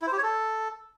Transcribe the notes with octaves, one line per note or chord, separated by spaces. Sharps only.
E4
C5
G4
C#5
A4